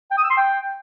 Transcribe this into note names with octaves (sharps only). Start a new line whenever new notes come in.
G5
D#6
E6
C6
G5